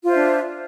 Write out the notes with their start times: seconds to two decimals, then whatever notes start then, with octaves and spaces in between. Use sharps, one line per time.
0.04 F4
0.07 C5
0.11 E5
0.14 D4